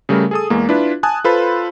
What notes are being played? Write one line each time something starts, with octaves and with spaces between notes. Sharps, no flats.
C#3 G3 A3 A#4
G#4 A4 D#6
E2 G#3 A#3
D4 E4 F4 B4
G#5 A5 D#6 F#6
F4 A4 B4 C5 B5